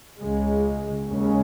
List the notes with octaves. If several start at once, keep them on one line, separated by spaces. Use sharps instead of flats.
C#2 C#3 G#3
D#2 C#3 G#3 C#4